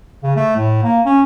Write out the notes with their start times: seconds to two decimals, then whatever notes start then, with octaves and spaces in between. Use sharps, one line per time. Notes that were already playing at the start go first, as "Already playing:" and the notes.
0.23 C#3
0.36 A3
0.56 A2
0.83 A#3
1.05 C#4